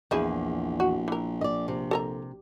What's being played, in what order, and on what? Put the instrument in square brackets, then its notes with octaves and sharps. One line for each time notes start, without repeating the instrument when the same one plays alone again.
[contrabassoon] A#1 [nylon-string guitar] E2 [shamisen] F3 E4 G#4
[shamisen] F#4
E3 A#4
[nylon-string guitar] D5 D#5
C3
[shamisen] A4 A#4 A#5